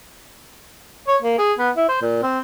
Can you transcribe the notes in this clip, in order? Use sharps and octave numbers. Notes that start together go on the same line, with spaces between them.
C#5
A#3
G#4
B3
E4
C5
A#2
C4